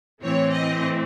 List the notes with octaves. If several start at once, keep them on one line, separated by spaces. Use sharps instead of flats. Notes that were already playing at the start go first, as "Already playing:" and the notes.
A2 E3 C4 C#5
D#5